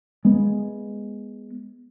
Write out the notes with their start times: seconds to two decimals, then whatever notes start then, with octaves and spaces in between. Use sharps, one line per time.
0.25 G#3 B3